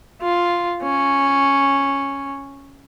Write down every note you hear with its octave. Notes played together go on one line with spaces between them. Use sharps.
F4
C#4